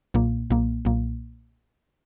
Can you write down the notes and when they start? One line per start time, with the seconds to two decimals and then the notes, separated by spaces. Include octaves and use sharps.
0.14 B1 A#2 A#3
0.50 B1 A#2 A#3
0.85 B1 A#2 A#3